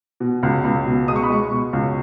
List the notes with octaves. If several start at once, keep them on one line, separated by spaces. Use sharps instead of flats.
B2
C#2
C#2
B2
G#3 D#6
C#6
B5
G#3 C#6
B2
C#2